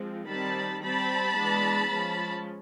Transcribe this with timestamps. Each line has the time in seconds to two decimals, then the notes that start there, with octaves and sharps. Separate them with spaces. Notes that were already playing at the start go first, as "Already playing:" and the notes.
Already playing: F3 G#3 C4
0.28 D#3 G3 C4 A5 B5
0.82 G3 C4 A5 B5
1.36 E3 G#3 B3 D4
1.91 F3 G#3 C#4